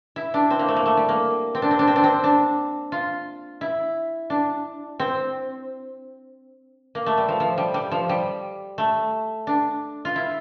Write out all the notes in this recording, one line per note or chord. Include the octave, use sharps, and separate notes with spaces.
E4
D4
C4
A#3
A3
A#3
A3
G3
A#3
C4
D4
C4
D4
C4
D4
C4
D4
F4
E4
D4
C4
A#3
A3
G3
F3
F3
G3
G3
F3
G3
A3
D4
F4
E4